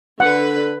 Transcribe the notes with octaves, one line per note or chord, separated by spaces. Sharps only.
D3 B4 F#5